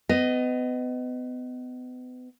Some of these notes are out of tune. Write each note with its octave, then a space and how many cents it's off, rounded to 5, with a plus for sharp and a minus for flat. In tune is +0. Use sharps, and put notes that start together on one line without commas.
B3 +35 D#5 +0